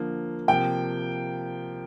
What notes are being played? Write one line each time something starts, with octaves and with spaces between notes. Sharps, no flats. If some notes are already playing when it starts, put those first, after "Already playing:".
Already playing: D3 F3 A#3
C3 F3 A#3 G5